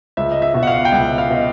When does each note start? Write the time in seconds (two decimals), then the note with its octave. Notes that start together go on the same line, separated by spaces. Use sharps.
0.17 C#2 E5
0.32 D#5
0.42 E5
0.54 B2
0.63 F#5
0.67 F5
0.85 G5
0.92 C#2 F#5
1.18 F5
1.30 B2 D#5